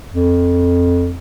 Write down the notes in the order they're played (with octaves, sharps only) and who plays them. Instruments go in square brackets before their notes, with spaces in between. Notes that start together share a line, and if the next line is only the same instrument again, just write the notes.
[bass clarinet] F2